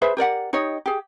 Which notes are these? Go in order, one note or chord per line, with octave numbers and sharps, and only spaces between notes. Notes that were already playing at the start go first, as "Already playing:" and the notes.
G#4 B4 C5 E5
G4 A#4 D5 F#5
D#4 G4 C#5 D#5
G4 G#4